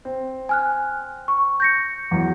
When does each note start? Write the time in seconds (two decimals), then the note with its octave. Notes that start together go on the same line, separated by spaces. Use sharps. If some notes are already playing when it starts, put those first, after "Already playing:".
0.05 C4
0.49 G#5 F6 F#6
1.28 C#6
1.60 G6 A#6 C#7
2.11 E2 F#3